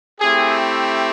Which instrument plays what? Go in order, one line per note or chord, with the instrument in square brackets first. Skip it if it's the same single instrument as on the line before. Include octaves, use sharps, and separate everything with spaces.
[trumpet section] A3 C4 E4 G4 G#4